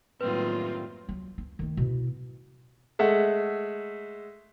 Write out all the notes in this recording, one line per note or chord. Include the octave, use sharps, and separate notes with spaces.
F#2 A2 D#3 G3 A#3 C4 F4 B4
F#3
C#4
D#3 A3
B2 E4
G#3 A3 E5 F#5